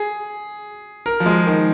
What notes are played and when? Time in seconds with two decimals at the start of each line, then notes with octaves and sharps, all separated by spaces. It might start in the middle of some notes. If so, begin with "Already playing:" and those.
Already playing: G#4
1.06 A#4
1.20 F3
1.26 G#3
1.47 D#3